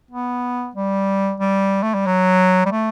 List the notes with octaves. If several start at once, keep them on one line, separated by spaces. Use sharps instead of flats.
B3
G3
G3
A3
G3
F#3
G3
A3